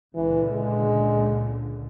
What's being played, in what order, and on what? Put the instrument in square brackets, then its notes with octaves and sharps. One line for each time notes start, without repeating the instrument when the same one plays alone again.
[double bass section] C#2 A#2 D3 [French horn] E3
[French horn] G#3